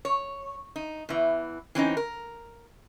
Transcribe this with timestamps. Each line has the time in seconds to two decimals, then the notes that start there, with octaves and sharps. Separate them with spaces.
0.05 C#5
0.76 D#4
1.09 E2 E3
1.75 E3 C4 C#4 D#4
1.97 A#4